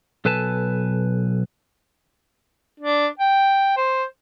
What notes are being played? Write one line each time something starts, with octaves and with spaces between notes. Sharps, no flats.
B1 A4 B4 G#5 A5
D4
G5
C5